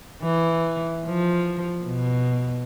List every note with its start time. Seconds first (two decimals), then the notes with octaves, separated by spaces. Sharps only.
0.23 E3
1.06 F3
1.85 B2